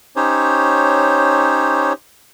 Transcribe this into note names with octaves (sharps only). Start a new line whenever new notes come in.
C#4 D#4 G4 C5 C#5